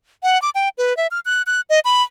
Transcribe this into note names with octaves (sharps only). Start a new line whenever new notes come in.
F#5
D6
G5
B4
E5
F6
F#6
F#6
D#5
B5